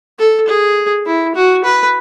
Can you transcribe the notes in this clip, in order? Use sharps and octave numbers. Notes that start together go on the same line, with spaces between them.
A4
G#4
E4
F#4
B4